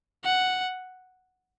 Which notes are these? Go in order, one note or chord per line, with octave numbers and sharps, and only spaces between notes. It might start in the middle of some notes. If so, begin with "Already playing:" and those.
F#5